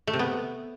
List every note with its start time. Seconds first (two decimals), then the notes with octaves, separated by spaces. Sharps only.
0.07 A3
0.13 C3
0.19 B3